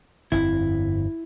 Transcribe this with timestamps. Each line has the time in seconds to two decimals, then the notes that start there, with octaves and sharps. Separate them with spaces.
0.32 G1 F2 C4 E4